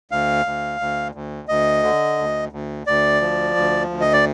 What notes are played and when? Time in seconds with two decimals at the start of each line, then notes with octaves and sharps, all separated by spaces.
0.11 D2 F5
0.46 D2
0.80 D2
1.15 D2
1.48 D2 D#5
1.83 D3
2.18 D2
2.52 D2
2.87 D2 D5
3.21 F3
3.56 D2
3.90 D2
4.01 D#5
4.13 D5